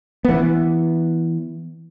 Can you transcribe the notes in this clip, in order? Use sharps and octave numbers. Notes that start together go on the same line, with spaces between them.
E3 B3